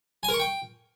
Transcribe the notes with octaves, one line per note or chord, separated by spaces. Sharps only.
G#5
A#4
C#6
G5